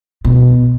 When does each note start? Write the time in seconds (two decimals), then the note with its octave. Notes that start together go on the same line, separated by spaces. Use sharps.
0.25 B2